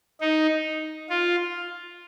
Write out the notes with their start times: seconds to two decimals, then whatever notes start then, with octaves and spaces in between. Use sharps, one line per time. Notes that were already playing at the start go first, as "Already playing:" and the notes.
0.21 D#4
1.09 F4